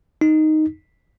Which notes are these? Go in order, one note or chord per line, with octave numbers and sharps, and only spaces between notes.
D#4